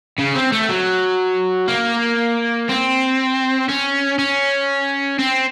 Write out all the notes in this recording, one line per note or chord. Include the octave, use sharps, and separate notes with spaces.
C#3
C4
A3
F#3
A#3
C4
C#4
C#4
C4